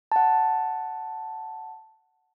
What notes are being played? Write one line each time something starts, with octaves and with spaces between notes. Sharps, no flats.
F#5 A5